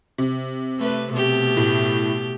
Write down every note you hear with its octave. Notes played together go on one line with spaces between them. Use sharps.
C3
A3 B4
B2 A3 G4
A2